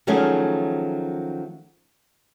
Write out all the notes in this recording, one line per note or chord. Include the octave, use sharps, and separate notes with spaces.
D#3 F3 F#3 A3 C#4 G#4